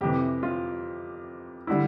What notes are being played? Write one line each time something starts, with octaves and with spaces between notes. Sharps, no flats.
F2 C3 E3 G4
F4
D3 G3 E4